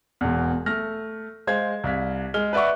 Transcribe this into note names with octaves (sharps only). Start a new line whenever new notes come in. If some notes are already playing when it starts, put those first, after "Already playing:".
E1 E2
A3 F6 A#6
G#3 C5 F5 G#6
C2 F5 B6
G#3 F6 G7
B4 D5 E5 F#5 C#6